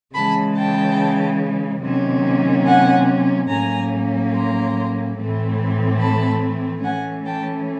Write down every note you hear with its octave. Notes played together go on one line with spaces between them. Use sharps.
C#3 E3 G#3 A5 B5
G5 A5
C3 D#3 F#3 A#3 C#4
F#5 G#5
A2 F#3 A#3 C#4 G#5 A#5
A#5 C6
A2 E3 A3 C4
A5 B5
E3 A3 C#4 F#5 G#5
G5 A5